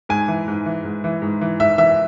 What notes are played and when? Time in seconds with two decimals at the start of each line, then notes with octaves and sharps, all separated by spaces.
0.09 G#2 G#5
0.28 E3
0.48 G#2
0.66 E3
0.84 G#2
1.04 E3
1.22 G#2
1.41 E3
1.60 G#2 E5
1.78 E3 E5